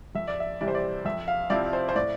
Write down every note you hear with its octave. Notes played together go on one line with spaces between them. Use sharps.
F2 E5
D5
E5
C3 E3 G3 D5
C5
D5
F2 E5
F5
C3 F3 C4 E4 D5
C5
C5
A2 D5